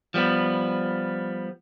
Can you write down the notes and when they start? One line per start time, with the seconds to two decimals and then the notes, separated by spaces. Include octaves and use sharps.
0.14 F3 G3 B3